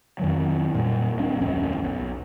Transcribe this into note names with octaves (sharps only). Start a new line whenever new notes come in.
F2 D#3 F#3
A#2 G3
D#2 G3 C4 D4
D1 F2 C#4
B1 F2